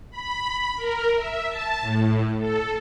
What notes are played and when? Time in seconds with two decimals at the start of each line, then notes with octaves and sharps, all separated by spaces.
0.11 B5
0.76 A#4
1.16 E5
1.48 A5
1.82 A2
2.38 A4